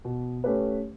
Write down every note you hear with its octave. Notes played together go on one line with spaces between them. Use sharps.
B2
A3 C#4 G4 B4